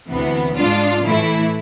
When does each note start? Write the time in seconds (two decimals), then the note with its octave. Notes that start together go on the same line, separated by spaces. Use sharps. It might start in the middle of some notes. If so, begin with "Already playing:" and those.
0.10 D2 C3 E3 B3
0.56 G#2 G#3 D4 F4
1.04 A2 E3 A3 E4